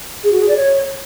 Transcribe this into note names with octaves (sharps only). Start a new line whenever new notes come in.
G#4
F#4
G#4
D5
C#5